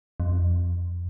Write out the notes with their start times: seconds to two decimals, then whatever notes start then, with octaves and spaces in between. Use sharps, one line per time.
0.20 F2